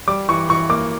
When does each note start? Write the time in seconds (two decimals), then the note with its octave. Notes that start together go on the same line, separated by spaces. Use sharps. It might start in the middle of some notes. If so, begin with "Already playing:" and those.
0.08 G3 D6
0.29 E3 C#6
0.49 E3 C#6
0.69 A#3 D6